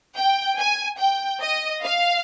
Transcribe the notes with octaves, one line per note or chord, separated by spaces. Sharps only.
G5
G#5
G5
D#5
F5